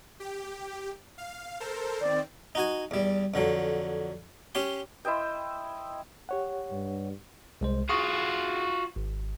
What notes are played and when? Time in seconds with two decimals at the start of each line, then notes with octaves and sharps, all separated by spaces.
0.20 G4
1.18 F5
1.60 A4 A#4 C5
2.01 D#3 C4 D5
2.55 D#4 F#4 G#5
2.91 E2 G3
3.34 F2 D3 F#3
4.55 C#4 G4 C6
5.05 E4 C5 D#5 G5
6.29 G4 C#5 F#5
6.71 G2
7.61 C2 G#3 C5
7.89 F4 F#4 G#4 C#6 D#6
8.96 G#1